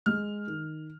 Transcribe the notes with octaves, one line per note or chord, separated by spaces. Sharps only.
G#3 F6
D#3